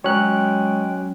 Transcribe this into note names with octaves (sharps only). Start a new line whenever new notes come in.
F#3 G#3 C#4 C#5 G5 F#6